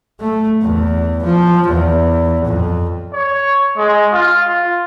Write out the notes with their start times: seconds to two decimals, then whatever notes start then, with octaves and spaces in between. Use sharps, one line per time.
0.20 A3
0.62 E2
1.24 F3
1.68 E2
2.45 F2
3.13 C#5
3.77 G#3
4.13 F4